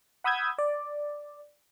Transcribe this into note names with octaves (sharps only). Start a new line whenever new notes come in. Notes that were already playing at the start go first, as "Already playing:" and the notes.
F#5 B5 D#6 E6 G6 G#6
D5